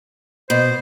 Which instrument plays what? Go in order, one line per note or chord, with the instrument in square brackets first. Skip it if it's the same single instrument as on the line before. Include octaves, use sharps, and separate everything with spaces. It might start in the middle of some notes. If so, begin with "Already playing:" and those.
[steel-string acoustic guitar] B2 [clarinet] C5